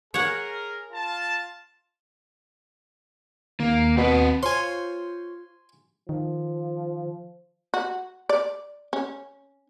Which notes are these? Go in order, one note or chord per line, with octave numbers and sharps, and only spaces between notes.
G#4 A#4 C#5 F#5
F4 A5
D#2 A#3
B2 C4 B4
F4 C5 C#5 G#5 C6
D#3 F3
F#4
D5
C#4